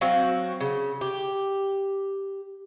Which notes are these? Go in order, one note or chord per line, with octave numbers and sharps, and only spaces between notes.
F#3 C4 F#4 F5
C#3
G4